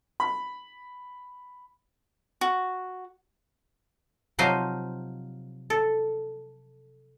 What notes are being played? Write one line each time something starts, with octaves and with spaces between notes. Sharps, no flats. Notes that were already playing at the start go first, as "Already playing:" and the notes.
B5
F#4
C3 F3 F#3 D#4 C5 F5
A4